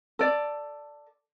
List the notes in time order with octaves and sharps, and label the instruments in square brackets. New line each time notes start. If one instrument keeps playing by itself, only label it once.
[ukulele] A4 D5